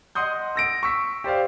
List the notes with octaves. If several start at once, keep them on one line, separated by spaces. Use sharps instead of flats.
D#5 F#5 C6 D#6 G6
E6 A#6 D7
C#6 E6 B6
G4 C5 D5 F5